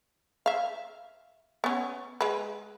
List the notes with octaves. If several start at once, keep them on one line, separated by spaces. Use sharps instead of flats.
E5 F5
B3 C#4
G#3 B4